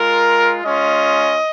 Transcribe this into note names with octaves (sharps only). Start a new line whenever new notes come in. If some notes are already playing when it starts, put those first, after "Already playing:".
Already playing: G#3 F4 A#4
G#3 C#4 F4 D#5